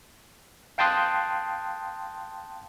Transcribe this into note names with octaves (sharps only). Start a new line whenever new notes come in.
F5 G5 A5 C6 D#6 F#6